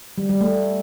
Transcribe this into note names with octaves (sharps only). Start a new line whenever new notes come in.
G3
G3
A3